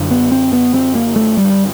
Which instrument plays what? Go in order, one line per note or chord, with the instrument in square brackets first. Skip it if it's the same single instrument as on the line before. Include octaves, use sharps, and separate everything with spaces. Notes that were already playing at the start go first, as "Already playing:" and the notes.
Already playing: [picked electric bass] F#2 D3
B3
C4
B3
C4
A#3
A3
G3